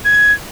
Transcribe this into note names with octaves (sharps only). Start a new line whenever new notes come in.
G#6